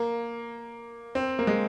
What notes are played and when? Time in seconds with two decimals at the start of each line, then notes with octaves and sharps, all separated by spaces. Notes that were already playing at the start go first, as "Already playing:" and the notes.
Already playing: A#3
1.15 C4
1.39 A#3
1.47 G#3